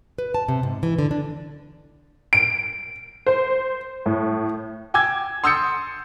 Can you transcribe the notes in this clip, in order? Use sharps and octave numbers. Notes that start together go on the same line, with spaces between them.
B4
A5
C3
G#2
E3
D3
D4
D7
C5
A2
G5 G#5 D6 E6 G#6
C6 D#6 E6 G6 A6 C#7